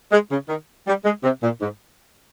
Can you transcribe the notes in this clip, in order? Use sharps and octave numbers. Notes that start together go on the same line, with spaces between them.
G#3
C#3
D#3
G3
G#3
C3
A#2
G#2